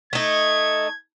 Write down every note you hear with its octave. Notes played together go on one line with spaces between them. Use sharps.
A3 D#4 G#6